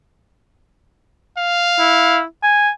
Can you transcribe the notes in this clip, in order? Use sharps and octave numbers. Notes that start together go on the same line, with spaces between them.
F5
E4
G#5